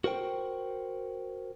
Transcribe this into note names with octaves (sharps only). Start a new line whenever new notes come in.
F#4 A#4 C5 G5